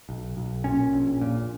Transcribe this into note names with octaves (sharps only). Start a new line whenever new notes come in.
B1
B1
A#2 C#4
A#1
A#2